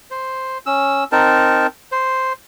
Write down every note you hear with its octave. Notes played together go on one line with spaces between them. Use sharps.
C5
C#4 E6
C4 D#4 A#4 A5
C5